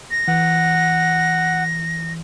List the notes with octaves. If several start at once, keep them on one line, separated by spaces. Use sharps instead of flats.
A#6
E3 F#5